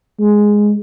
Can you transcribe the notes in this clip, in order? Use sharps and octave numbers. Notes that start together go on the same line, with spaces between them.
G#3